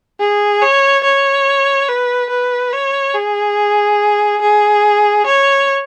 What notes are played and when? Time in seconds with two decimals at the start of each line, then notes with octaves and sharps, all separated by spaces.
0.20 G#4
0.62 C#5
1.04 C#5
1.88 B4
2.30 B4
2.73 C#5
3.14 G#4
4.42 G#4
5.26 C#5